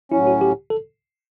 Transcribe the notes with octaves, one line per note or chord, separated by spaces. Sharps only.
A2 F#3 C#4 E4
F#4
G4
A4